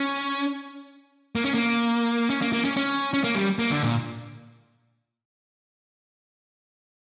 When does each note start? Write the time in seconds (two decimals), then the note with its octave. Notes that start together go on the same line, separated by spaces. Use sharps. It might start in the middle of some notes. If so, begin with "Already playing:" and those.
Already playing: C#4
1.35 A#3
1.45 C#4
1.54 A#3
2.30 C#4
2.42 A#3
2.53 A#3
2.65 C#4
2.77 C#4
3.14 C#4
3.24 A#3
3.35 G3
3.59 A#3
3.71 D3
3.83 A#2